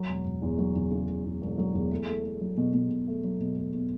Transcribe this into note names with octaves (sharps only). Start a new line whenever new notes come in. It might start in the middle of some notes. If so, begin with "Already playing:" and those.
Already playing: F#3
E1
E1
E2
F#3
E2
C#3
C#3
E2
E1
F#3
E2
A3
A3
A3
F#3
B2
B2
B2
A3
F#3
B2
A3
B2